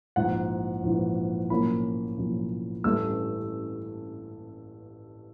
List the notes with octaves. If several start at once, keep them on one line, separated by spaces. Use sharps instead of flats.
A#1 G#2 E3 F#5
A#1 G#2 E3
B1 A2 F3 A#3 C#4 B5
B1 A2 F3 A#3 C#4
A1 G2 E3 A3 C#4 E6